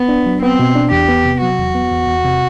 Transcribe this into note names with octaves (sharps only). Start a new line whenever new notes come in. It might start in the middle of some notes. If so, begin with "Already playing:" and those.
Already playing: B3
D4
F#3
B3 C4
B2
D4
E2 G4
B3
C3
F#3 F#4
E2
B3
E2
E2
C3